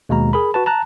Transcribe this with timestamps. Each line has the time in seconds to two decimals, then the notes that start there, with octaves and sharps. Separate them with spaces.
0.09 D#2 B2 G#3 A#5
0.33 G#4 A#4 B5
0.54 F#4 B4 A5
0.66 A5 A#5 F#6